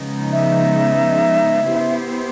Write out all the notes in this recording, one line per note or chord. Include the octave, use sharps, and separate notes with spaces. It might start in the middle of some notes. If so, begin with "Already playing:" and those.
Already playing: C#3 F3 G#3 B3 D#4
E5
B3 E4 G4 C5